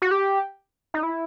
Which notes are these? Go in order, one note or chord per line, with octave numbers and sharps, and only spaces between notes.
F#4
G4
D#4
E4